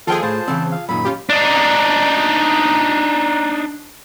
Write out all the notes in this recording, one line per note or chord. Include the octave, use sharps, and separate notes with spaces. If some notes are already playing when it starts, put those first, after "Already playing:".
D#2 F3 F4 G#4 A4 G5
A2 C5 A5
C#3 E3 C4
F5
F#2 A#2 D#3 B5
C#4 F4 G4
D4 D#4